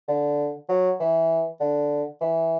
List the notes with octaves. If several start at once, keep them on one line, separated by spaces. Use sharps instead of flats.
D3
F#3
E3
D3
E3